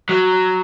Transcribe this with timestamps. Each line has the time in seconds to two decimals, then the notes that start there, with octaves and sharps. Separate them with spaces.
0.09 F#3